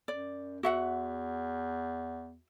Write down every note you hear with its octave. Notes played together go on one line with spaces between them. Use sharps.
F#2 D5
E2 F#4 E5 F#5